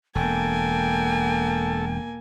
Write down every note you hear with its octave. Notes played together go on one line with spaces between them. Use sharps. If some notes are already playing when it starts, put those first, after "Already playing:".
E1 A#3 A4 G5 G#5